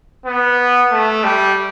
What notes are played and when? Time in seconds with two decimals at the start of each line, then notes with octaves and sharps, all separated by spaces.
0.26 B3
0.92 A3
1.24 G3